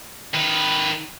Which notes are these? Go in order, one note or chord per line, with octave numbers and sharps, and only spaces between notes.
D#3 B4